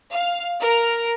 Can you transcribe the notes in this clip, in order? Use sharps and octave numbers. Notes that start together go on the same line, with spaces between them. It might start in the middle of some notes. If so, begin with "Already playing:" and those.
F5
A#4